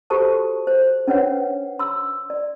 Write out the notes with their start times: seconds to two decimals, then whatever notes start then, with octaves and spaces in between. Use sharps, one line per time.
0.10 F#4 G4 A4 C5 A5 C#6
0.67 C5
1.07 C#4 D4 B4 C#5 F#5
1.79 C6 E6
2.30 D5